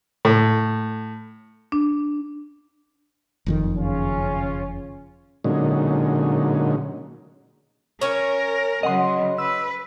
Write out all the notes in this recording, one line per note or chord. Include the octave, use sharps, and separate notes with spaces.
A2
D4
F#1 F2 D#3
C#3 C#4 F4
A#2 D3 F#3 G#3 C#4 D#4
C#4 A#4 C#5
C#3 F#3 D#5 F#5 C6
B4 E6